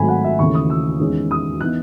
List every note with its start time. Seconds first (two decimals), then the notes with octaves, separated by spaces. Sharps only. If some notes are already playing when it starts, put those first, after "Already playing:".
Already playing: G#1 G#2 F#3 A3 G#5 B5
0.09 F#5
0.24 E5
0.39 D#2 C#3 E3 A3 C#6
0.54 D#6
0.70 E6
1.00 E2 D#3 G#3 C#4
1.31 D#6
1.61 E3 B3 D#4 F#6